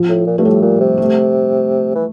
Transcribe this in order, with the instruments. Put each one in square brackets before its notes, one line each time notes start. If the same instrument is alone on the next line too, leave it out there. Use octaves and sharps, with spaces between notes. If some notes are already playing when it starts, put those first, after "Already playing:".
Already playing: [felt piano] F3
[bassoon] A2
A#2
[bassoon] G2 [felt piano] A3
[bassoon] A2 [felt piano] G3
[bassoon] A#2
C3
[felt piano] A3
[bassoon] E3